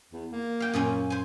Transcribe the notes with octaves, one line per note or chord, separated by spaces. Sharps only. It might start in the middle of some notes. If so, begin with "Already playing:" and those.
E2
A#3
F5 G5
F#2 A#2 C#4
C5 G#5